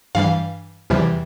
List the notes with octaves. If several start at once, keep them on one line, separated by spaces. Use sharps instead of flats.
G2 E3 G3 F5
E2 C3 E3 G3